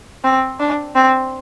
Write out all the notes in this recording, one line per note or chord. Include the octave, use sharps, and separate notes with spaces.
C4
D4
C4